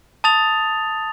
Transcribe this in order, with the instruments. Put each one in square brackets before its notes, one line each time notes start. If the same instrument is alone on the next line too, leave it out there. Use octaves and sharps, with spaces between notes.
[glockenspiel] A5 D#6 A6 F7